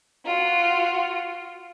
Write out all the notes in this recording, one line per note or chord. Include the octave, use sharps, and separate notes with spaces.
F4 F#4